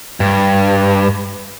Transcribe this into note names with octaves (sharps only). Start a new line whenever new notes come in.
G2